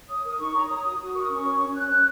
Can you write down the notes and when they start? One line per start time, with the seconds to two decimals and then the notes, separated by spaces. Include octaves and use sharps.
0.09 C#5 D#6
0.24 A#4 D#6
0.39 D#4 C#6
0.54 C#5 A#5
0.68 C#5 D#6
0.83 F#4 D#6
0.99 F#4 D#6
1.14 A#4 C#6
1.22 D#6
1.29 C#4 C#6
1.45 C#5
1.60 C#4
1.74 C#5 F#6
1.90 C#5